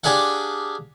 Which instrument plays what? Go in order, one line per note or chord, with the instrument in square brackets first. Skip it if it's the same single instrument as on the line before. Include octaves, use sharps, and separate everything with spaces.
[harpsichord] D4 G4 G#4 D5 F5 F#5